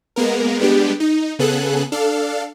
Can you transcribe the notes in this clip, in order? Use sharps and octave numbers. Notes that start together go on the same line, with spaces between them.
G#3 A#3 B3 A#4
G3 G#3 B3 D4 G4
D#4
C#3 B3 G#4 A4 F#6
D4 A4 F5